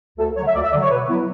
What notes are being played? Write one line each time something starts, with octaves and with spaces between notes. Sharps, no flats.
D2 A4
D3 F#3 C#5
E5
D2 D5
E5
D3 F#3 D5
C#5
B2 B4
F#3 B3 E4